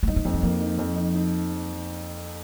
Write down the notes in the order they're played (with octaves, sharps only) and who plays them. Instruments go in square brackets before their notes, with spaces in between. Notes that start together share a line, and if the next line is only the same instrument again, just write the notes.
[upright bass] A#3
[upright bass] G#3 [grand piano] D#4
[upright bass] C4
[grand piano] F2 [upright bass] A#3
[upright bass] G#3
[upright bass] F3 [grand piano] A#3
[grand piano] D#4
F2
D#4
D#4